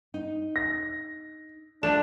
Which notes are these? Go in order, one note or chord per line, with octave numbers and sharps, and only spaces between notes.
D#4
A#6
F3 A3 D4 E7